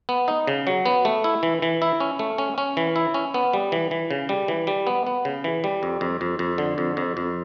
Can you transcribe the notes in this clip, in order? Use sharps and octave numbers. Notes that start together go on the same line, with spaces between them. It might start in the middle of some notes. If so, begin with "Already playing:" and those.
B3
D#4
C#3
F#3
B3
A3
E4
E3
E3
E4
C#4
A3
C#4
C#4
E3
E4
C#4
B3
G3
E3
E3
C#3
G3
E3
G3
B3
B3
C#3
E3
G3
F2
F2
F2
F2
D3
F2
F2
F2